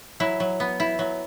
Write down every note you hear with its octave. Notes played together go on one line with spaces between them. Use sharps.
F#3 E4
F#3
B3
E4
F#3